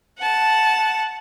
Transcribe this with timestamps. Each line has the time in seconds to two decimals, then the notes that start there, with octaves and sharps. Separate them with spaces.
0.18 F#5 A5